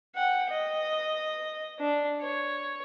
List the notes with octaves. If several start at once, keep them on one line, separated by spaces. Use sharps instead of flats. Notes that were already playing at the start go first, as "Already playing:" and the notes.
F#5 G5
D#5
D4
C#5